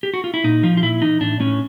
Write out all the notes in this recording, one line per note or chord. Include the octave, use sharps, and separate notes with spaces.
G4
F#4
F4
E4
A#2 D#4
F3 F4
F4
A#2 E4
E3 D#4
A2 D4
A2 C#4